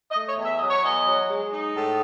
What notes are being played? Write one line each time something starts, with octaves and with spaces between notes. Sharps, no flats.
D#5
A3
C#5
E2
E5
F#3 D#5
C#5
E2 D#5
F#3
G#3
D#4
A2